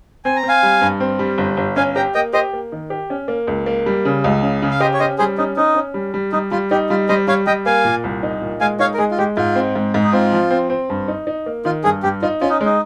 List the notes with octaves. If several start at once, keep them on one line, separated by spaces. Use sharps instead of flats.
C4 G#5
A#5
C4
F5 G#5
G3
G2
C4
G3
G1
G1
C#4 F5 G#5
G4 G5 A#5
A#3 D#5 G5
G4 C5 D#5
A#3
D#3
G4
C#4
A#3
C#2
A#3
G3
C#3
C#2
C#3
C#3
F5
G4 C5 D#5
C#5
C#4 C5 D#5
G3 G#4 C5
C#4 D#4
C#4 D#4
C#4
G3
G3
G3 D#4
G3 F4
D#4 G4
G3 F4
G3 C5 D#5
G3 C#5 F5
G3 D#5 G5
A#3 F5 G#5
A#2
C2
D#4
A#2
G#3 F5 G#5
D#4 C#5 F5
A#4
G#3 G#4
F4
G#3 G4
G#2 F4
C4
G#2
G#2
D#4
C4 F4
F3
C4
C4
G2
D#4
D#4
A#3
D#3 F4
G2 G#4
G2 G4
D#4 F4
C#4 F4
D#4
G#3 D#4